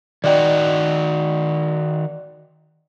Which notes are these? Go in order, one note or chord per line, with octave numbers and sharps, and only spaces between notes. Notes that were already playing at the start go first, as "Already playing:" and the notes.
D#3 F#4 D5 D#5 G5